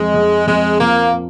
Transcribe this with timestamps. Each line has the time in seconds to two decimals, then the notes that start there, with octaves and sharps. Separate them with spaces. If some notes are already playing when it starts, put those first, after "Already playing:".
Already playing: F2 G#3
0.14 F2
0.47 F2 G#3
0.80 F3 A#3